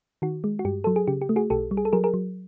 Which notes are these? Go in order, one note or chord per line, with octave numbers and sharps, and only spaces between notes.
D#3 F#4
G#3
F#4
G2 G4
F#3 A4
G#4
C#3 G4
G4
A3
F#4 G#4
B1 G4 A4
G3
G#4
A4
F#3 G#4 A#4
G#4 A#4
F#3